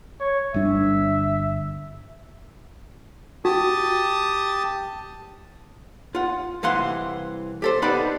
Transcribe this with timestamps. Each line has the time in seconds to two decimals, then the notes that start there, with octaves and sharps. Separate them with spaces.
0.20 C#5
0.54 G1 G3 D4 E5
3.45 F#4 G4 A5 D#6
6.15 F4 F#5
6.63 C2 E3 F5 F#5 C6
7.62 G4 A4 C5
7.82 B3 D4 D#4 G4 D5 B5